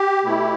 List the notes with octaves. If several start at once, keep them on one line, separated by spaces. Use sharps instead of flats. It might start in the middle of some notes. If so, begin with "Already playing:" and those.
Already playing: G4
B2 A3 E4